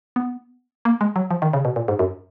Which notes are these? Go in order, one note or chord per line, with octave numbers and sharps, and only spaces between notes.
B3
A#3
G#3
F#3
F3
D#3
C#3
B2
A#2
G#2
F#2